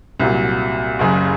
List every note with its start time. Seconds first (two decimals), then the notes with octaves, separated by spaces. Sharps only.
0.20 C2 A#2 F#3
0.99 F#1 F#2 C#3